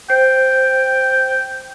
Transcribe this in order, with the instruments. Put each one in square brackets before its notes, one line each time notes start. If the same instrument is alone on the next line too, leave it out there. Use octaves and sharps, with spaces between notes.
[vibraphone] C5 [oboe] G5